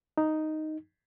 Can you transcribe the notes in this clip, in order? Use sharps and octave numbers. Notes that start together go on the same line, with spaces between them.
D#4